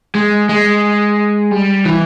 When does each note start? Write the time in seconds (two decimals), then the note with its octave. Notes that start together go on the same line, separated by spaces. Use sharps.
0.15 G#3
0.49 G#3
1.51 G3
1.86 E3